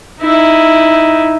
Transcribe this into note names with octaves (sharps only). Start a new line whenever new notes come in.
D#4 E4